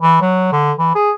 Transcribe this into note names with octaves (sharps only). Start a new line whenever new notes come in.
E3
F#3
D3
E3
G#4